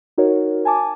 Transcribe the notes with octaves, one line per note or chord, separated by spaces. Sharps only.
D#4 F#4 A#4 C#5
G#5 A5 D6